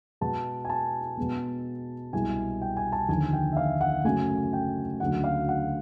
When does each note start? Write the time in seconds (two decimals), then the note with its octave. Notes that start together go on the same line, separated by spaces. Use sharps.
0.21 B2 G#3 B3 A5
0.65 G#5
0.69 A5
1.17 B2 G#3 B3
2.13 C2 B2 G#3 G#5
2.62 G5
2.77 G#5
2.92 A5
3.09 D#2 D3 F3 G#5
3.33 G5
3.52 E5
3.57 F5
3.81 F#5
4.04 F#2 C#3 F#3 A3 G#5
4.53 G5
5.00 D2 C#3 F#3 F#5
5.24 F5
5.48 F#5